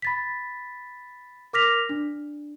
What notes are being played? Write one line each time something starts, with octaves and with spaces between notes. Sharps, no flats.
B5 A6 B6
A#4 D6 F6 A#6 B6 F7
D4